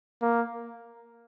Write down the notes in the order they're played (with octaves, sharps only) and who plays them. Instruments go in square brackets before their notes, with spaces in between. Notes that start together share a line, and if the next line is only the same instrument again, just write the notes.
[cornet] A#3